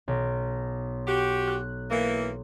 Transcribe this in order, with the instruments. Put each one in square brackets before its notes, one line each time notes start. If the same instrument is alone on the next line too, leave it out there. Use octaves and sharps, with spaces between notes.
[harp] B1
[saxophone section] F#4 G4
[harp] F#6
[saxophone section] E3 A#3